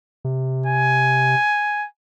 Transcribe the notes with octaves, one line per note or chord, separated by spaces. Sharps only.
C3
G#5